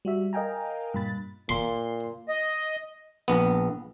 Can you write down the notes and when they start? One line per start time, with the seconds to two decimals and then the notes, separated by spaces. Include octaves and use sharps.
0.05 G3 F#4 E5
0.33 A#4 D#5 F5 G5 G#5 A#5
0.94 G2 A#2 B5 A6
1.49 A#2 C6
2.29 D#5
3.28 A#1 B3